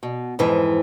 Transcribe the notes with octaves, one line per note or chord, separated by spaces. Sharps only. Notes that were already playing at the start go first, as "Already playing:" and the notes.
B2
F2 G#2 E3